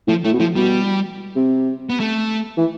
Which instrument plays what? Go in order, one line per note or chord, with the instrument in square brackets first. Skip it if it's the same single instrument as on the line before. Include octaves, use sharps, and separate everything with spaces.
[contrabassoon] A2 [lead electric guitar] F3
[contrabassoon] A2 [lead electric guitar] A3
[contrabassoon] B2
[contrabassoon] A2 [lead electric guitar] F3
[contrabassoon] B2 [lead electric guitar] G3
[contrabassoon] C3
[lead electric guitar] B3
A3
[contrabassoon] E3